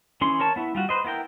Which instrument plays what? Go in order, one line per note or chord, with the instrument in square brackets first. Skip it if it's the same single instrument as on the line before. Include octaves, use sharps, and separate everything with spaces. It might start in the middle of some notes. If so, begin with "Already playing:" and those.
[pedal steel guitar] E3 C#4 G#4 C6
A#4 C#5 A5
B3 E4
G3 F4 F#4
B4 C5 D#5
B3 E4 A#4 G5